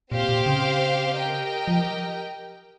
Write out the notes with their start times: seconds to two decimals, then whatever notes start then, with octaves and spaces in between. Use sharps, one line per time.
0.11 A#2 C4 G4 C5 F5
0.29 A#2
0.46 C#3
1.15 G4 A#4 D#5 G5
1.68 F3